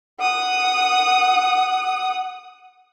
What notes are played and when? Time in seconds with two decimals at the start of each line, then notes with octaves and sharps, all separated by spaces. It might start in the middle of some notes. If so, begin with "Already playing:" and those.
0.20 F#5 D#6